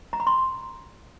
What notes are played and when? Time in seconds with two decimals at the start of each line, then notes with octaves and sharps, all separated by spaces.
0.13 A#5
0.20 B5
0.27 C6